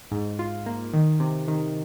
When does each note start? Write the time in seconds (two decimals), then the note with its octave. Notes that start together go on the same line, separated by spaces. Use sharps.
0.12 G#2
0.39 F4
0.66 A#3
0.94 D#3
1.20 C3
1.48 D#3